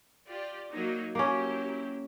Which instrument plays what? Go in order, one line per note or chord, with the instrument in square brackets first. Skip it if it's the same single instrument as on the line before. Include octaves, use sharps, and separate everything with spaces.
[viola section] F4 G4 D5
F#3 A#3 D#4
[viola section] F#3 E4 G4 [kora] A#3 C#4